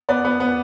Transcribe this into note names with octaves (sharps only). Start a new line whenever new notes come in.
B3 D5
B3
B3